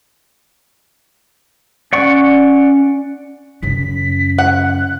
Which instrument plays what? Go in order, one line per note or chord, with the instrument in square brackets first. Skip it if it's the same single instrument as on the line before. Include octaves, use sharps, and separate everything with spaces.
[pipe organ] C#4 [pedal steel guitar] D5 F#5 C#6
[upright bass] F#2 C#3 [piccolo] B6
[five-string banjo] F#5 [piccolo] F#6